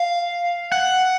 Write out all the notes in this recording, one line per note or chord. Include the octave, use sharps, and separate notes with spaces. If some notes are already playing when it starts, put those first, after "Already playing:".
Already playing: F5
F#5